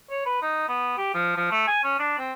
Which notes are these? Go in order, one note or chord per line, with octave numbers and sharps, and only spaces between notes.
C#5
B4
D#4
B3
G4
F3
F3
A3
G#5
C#4
D4
C4